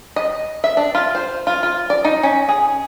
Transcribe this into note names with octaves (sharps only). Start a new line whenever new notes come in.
D#5
E5
D4
F4
C5
F4
F4
D5
D#4
C#4
G#4